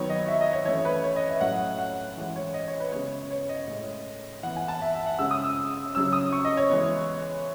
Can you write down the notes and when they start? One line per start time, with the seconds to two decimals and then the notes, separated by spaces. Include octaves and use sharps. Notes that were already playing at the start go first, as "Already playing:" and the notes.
Already playing: D#3 F#3 B3 C#5
0.10 D#5
0.28 E5
0.41 D#5
0.53 C#5
0.65 E3 A3 C#4 C#5
0.85 B4
1.04 C#5
1.16 D#5
1.29 E5
1.41 A2 F#3 A3 C#4 F#5
1.78 F#5
2.17 E3 G#3 C#4
2.36 C#5
2.54 D#5
2.68 C#5
2.80 B4
2.92 C#3 G#3 B3 C#5
3.11 C#5
3.31 C#5
3.49 D#5
3.68 A2 G#3 C#4
4.43 E3 B3 F#5
4.56 G#5
4.68 A5
4.82 E5
4.94 E5
5.06 F#5
5.19 C#3 G#3 C#4 E6
5.31 D#6
5.43 E6
5.95 C#3 F#3 C#4 E6
6.13 D#6
6.33 C#6
6.45 D#5
6.57 C#5
6.69 E3 G#3 B3